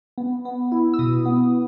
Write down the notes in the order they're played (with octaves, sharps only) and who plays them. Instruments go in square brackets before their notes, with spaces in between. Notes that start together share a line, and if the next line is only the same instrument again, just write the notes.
[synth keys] B3
B3
E4
E6
B2 D#6
B3